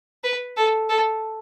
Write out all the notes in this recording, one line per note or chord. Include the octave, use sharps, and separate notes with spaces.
B4
A4
A4